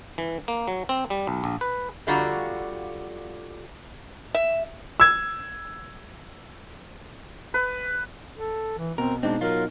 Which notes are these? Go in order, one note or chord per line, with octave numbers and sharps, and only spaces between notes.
E3
A#3
F#3
C4
G3
B1
A#1
B4
F2 D3 G3 F4 F#4 A#5
E5
E6 G#6
B4
A4
E3
B2 C4 A#4
B2 G#3 C4 D4 D#4
F#3 F4 A#4